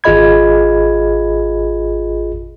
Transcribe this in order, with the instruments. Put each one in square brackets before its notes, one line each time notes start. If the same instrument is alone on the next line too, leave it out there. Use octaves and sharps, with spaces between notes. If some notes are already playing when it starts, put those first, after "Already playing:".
[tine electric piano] G#1 F4 G#4 D#5 B5 G#6